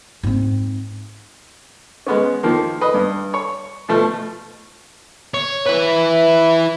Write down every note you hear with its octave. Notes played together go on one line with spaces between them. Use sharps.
G#2 C4
G#3 B3 C#4
D#3 F3 A#3
B4 D#5
G2
C#5
B2 F3 A3
C#5
E4 B4